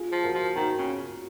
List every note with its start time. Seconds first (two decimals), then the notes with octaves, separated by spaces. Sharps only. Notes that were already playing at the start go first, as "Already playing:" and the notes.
Already playing: F4 G#4
0.12 F3
0.23 F#4 A#4
0.34 F3
0.55 D#3 F#4 A#4
0.78 C#3